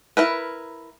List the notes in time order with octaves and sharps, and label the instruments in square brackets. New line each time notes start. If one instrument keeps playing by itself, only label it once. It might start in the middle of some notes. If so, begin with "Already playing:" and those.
[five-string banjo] E4 A#4 B4